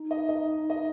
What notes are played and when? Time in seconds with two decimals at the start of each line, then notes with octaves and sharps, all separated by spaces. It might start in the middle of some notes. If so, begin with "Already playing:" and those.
Already playing: D#4
0.11 D#5
0.29 D#5
0.70 D#5